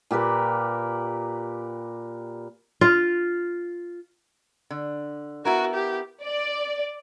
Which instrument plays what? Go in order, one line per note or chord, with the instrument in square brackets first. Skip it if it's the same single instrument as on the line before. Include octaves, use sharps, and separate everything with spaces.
[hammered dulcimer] A#2 G4 A#4 B4
[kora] F4
[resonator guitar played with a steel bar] D3
[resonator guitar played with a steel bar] B3 E4 A#4 [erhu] F#4
[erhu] G4
[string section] D5